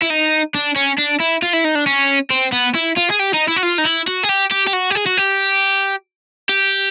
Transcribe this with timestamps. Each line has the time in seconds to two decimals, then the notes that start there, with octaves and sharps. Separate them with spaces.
0.02 E4
0.10 D#4
0.54 D4
0.76 C#4
0.98 D4
1.20 E4
1.42 F4
1.53 E4
1.64 D#4
1.75 D4
1.87 C#4
2.31 C4
2.53 B3
2.75 E4
2.96 F4
3.10 G#4
3.19 G4
3.33 D#4
3.48 E4
3.56 F#4
3.63 F4
3.78 D#4
3.85 E4
4.07 F#4
4.23 G#4
4.29 G4
4.51 G4
4.67 G4
4.73 F#4
4.90 G4
4.95 G#4
5.06 F#4
5.17 G4
6.49 G4